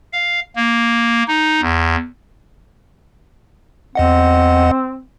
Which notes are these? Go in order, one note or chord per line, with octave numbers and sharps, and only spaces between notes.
F5
A#3
D#4
E2
E2 C4 D#5 F#5